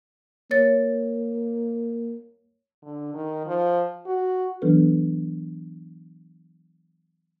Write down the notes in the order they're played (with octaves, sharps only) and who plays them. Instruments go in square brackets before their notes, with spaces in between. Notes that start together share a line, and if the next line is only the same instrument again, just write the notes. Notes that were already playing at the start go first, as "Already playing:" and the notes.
[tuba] A#3 [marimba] C#5 A6
[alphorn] D3
D#3
F3
F#4
[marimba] E3 F#3 B3 D4 A4 B4